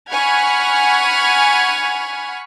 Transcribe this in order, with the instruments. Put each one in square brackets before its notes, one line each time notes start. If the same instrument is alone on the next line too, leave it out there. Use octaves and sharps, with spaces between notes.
[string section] F#5 G#5 B5 C#6 F6 G#6